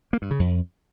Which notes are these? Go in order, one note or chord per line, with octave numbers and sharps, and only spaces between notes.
A#3
G2
C#3
F2